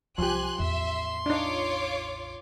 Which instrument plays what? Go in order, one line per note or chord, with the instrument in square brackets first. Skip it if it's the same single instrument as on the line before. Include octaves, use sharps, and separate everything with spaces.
[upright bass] C2 F#3 [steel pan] F3 G4 [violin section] G#5 F#6 [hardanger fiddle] C6
[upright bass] A1 E2 [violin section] E5
[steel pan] D4 D#4 [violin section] F4 C#5 D6